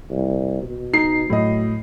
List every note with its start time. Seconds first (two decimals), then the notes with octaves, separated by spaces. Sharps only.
0.10 C2
0.62 B2
0.93 D#4 C7
1.30 A2 F#3 D#5